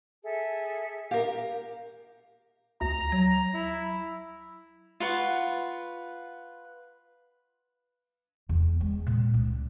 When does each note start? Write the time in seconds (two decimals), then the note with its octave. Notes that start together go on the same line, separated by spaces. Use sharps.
0.23 G#4 A4 E5
1.11 G4 A#4 F5
2.81 D2 A#5
3.12 F#3
3.54 E4
5.00 F4 B4 F#5 C#6
8.49 E2
8.81 G#3
9.07 A#2
9.34 C#2